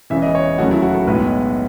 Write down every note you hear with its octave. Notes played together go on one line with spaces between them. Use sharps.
E1 E2 C#3 E3 E5
D#5
C#5
D#2 C#3 F#3 A3 F#4
E4
F#4
A4
B1 A2 G#3 B3 B4